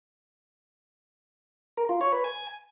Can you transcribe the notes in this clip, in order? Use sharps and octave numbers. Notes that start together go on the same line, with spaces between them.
A#4
F4
C#5
B4
G#5